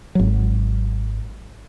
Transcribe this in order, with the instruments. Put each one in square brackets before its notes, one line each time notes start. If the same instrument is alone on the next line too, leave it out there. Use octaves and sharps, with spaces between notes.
[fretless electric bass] G#1 F#3